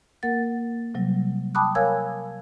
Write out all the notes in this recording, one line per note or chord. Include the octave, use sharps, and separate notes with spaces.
A#3 A#4 F#5 A6
C3 F#3 G3
G5 A5 B5 D6 D#6 F#6
A#4 C#5 F5 G#5 E6 G#6